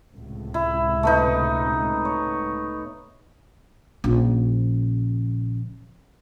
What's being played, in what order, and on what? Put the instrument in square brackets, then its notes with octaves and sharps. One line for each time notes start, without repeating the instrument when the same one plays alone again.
[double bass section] C#2 A2 C3
[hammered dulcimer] E4
A3 B3 D#4
C#5
[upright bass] A#1 C#3